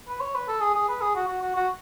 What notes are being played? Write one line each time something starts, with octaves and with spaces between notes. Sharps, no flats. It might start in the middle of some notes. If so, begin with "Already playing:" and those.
B4
C#5
B4
A4
G#4
G#4
B4
G#4
F#4
F#4
F#4
F#4